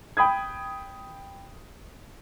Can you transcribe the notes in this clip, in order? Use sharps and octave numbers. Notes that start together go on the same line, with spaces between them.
G5 B5 D#6 G#6